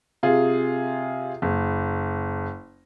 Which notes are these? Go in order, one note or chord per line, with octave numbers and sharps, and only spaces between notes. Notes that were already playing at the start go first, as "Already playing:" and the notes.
C3 F4 G#4
F#1